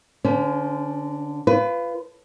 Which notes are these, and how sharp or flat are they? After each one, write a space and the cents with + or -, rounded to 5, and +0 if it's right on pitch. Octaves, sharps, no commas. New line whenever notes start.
D3 +0 C#4 +25 C5 -25
F4 -20 B4 +20